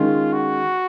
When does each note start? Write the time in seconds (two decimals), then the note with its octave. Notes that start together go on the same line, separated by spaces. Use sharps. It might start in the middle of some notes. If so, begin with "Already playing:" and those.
Already playing: D#3 G#3 C#4 F4
0.33 F#4